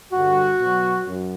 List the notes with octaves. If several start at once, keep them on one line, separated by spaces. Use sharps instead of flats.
G2 D3 G3 F#4
B2 F#3
F#2